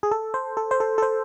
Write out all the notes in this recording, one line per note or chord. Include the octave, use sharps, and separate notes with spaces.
G#4
A4
C5
A4
C5
A4
A4
C5